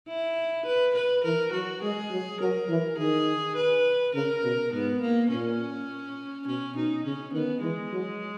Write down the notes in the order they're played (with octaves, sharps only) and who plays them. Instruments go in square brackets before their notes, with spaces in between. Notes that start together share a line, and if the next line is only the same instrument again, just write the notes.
[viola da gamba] E4
B4
B4
[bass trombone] E3 [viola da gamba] A#4
[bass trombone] F#3 [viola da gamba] F#4
[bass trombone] G#3 [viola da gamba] G#4
[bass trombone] F#3
[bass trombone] F#3 [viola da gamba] A#4
[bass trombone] E3
[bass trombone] D#3 [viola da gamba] G#4
[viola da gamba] B4
[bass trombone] C#3 [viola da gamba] A#4
[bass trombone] B2
[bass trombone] G#2 [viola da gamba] B3
[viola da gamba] A#3
[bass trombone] A#2 [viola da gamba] C#4
[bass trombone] B2 [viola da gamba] C#4
[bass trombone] B2 [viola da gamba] D#4
[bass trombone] C#3 [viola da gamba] C#4
[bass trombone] D#3 [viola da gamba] B3
[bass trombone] E3 [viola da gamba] G#3
[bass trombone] F#3